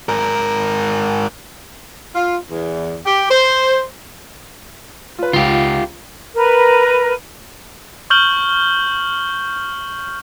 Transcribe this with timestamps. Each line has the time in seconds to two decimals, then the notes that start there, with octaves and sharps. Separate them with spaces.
0.09 G#2 A#4
2.14 F4
2.50 E2
3.05 G4
3.30 C5
5.19 F4 B4
5.33 C#2 F4 G4
6.35 A#4 B4
8.10 C#6 F6 G6 F#7 G7